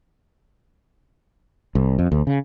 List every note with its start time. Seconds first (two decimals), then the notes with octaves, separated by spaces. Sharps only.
1.75 C2
1.99 F2
2.12 D2
2.27 C#3